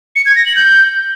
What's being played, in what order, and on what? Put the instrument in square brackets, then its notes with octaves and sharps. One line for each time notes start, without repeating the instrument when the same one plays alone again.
[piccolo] C#7
G#6
A#6
F#7
G6